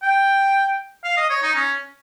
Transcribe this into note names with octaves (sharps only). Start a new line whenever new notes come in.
G5
F5
D#5
C#5
D#4
C#4